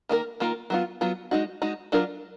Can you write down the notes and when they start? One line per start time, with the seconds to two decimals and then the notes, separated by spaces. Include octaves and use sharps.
0.09 D#3 A#3 F4 A#4
0.40 D#3 A#3 F4 A#4
0.70 F#3 B3 F4
1.01 F#3 B3 F4
1.31 G#3 D#4 F#4
1.62 G#3 D#4 F#4
1.92 F#3 D4 F4 A#4